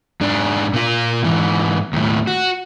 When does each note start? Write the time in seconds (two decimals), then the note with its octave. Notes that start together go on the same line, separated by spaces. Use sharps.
0.21 G#2 D4
0.73 A#2 F4
1.24 G#2 E3
1.93 D#2 A2
2.27 F#4